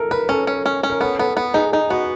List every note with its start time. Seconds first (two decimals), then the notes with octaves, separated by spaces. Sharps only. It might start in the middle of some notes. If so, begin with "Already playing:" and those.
Already playing: A4 A#4
0.11 A#4 B4
0.29 C#4 A4
0.47 C#4
0.66 C#4
0.83 C#4
0.90 A#4
1.01 B3 A4
1.19 B3 A4
1.37 B3 A4
1.54 D#4 G#4
1.72 D#4 G#4
1.90 B3 F#4